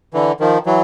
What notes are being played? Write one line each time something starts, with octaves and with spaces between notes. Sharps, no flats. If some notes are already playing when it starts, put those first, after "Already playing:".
D3 E3
D#3 F3
E3 F#3